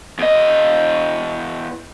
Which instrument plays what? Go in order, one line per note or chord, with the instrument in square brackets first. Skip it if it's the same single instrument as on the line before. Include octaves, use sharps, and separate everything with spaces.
[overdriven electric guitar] E2 D#5